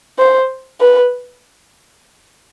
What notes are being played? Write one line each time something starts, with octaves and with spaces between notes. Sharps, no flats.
C5
B4